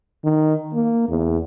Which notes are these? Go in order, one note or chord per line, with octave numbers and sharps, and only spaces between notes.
D#3
A#3
E2